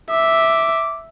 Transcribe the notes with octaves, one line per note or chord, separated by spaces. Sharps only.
E5 D6